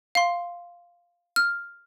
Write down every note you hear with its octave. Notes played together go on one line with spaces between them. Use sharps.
F5 C6
F6